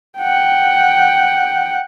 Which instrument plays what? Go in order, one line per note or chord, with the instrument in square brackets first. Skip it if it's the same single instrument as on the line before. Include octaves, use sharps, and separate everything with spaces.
[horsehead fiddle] F#5 G5